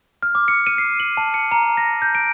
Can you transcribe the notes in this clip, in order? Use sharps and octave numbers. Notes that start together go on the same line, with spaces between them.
F6
D6
C#7
D#7
C7
F#7
A5
C#7
A#5
A#6
G6
D7